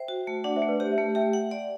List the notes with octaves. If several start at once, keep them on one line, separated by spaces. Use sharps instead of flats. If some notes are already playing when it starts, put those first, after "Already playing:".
Already playing: C5 E5 G5
F#4
A3
D4 D5 F#5
C5 E5
A3
B4 D5
G4 C5
C5 E5
A3
G4 E5 G5
F#5
D5